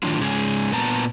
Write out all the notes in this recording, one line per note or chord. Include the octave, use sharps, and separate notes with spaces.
A2 D#3 F3 F#3 D4 F4
G#2 C#3 G#3 C#4 G#4
A#2 B3 A5 A#5